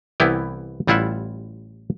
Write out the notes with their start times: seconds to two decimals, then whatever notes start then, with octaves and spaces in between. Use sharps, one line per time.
0.20 C2 E3 B3 E4 G4
0.87 A1 G3 E4 F4 E5 F#5